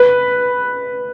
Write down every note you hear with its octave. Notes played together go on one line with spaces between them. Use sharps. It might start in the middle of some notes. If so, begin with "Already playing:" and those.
Already playing: B4